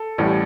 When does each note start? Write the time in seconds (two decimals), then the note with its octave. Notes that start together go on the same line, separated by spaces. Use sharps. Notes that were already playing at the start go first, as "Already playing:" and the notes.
Already playing: A4
0.18 A1 A2 G3